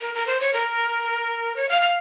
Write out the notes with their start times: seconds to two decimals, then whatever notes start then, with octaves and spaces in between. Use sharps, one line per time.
0.01 A#4
0.14 A#4
0.27 C5
0.40 C#5
0.53 A#4
1.56 C#5
1.69 F5
1.81 F5